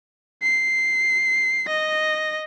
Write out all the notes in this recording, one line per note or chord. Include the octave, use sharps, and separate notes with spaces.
C7
D#5 A#6